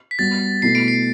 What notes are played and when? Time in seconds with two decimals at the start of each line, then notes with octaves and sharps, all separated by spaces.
0.11 B6
0.19 G3 B3 F#4 A6
0.62 B2 A3 E4 C7
0.75 D7
0.88 C7